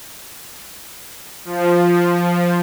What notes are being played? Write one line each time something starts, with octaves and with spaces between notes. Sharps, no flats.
F3